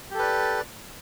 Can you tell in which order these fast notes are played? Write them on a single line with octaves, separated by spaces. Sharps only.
G4 A4 B4 D5